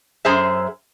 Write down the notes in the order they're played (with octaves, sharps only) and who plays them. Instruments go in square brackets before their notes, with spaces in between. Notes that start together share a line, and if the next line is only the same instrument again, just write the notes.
[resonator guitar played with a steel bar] F#2 G#4 C5 E5